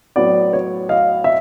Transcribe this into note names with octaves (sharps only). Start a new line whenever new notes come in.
A2 F#3 B3 D5
C#5
D#5 F5
E5